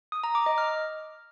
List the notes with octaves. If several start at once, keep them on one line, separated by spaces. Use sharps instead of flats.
D#6
A#5
D6
D#5
F6